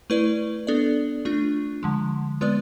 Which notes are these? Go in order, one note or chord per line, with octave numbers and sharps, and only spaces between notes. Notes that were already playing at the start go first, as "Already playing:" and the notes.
A3 E4 B4 D5
B3 D4 A4 D5
A3 D4 F4
D3 F3 G#3
G#3 B3 F4 B4 D5